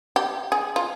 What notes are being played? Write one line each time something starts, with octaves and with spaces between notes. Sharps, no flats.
G4
G#4
F4